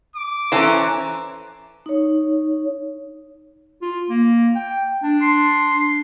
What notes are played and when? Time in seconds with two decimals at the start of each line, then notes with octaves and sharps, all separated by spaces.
0.16 D6
0.52 E3 C#4 A4 C5 A#5 C6
1.86 D#4 C#5
3.82 F4
4.10 A#3
4.56 G5
5.03 D4
5.22 C6